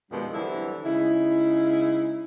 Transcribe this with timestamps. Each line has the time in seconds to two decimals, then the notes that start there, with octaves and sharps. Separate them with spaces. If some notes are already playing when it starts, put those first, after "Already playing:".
0.11 F2 B2 D#3 G3 G#3 D4
0.34 D3 E3 F#3 G3 C4 E4
0.85 C#3 G#3 D#4 E4